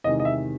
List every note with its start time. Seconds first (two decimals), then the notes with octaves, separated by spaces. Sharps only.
0.04 E2 C3 D#3 G#3 D#5
0.20 D#5
0.25 E5